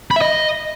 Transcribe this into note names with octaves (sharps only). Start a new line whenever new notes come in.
B5
E5
D#5